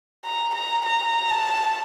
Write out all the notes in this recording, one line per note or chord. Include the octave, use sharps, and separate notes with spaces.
A#5
A#5
A#5
A5